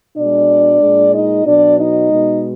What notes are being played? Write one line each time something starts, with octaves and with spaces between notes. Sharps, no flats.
B2 G#3 D4 D5
A#2 G#3
D#4 D#5
B2 F#3 D4 D5
D#4 D#5
B2 G#3